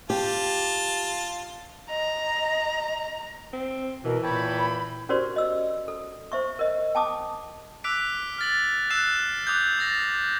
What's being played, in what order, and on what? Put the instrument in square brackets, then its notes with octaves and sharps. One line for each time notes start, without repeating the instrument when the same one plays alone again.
[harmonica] F4 A5 [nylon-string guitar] G4
[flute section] D#5 [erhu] A#5
[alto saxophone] C4
[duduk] B2 [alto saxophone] E3 [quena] A#4
[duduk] A#2 [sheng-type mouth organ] C#5 G5 A5 [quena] B5
[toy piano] C#4 F#4 G4 A#4 C5 D5
D#5 E6
A4
C5 E5 C#6
A#4 D#5
G5 A5 D6 D#6
[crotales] D6 E6 F#6 B6 D7
F6 A6 F#7
E6 F#6 C7 E7
D6 D#6 F#6 G6
D6 A6 A#6